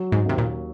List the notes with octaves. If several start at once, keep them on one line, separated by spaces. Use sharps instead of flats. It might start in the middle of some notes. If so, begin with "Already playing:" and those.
Already playing: F#3
G#2
D#2 C3
A#2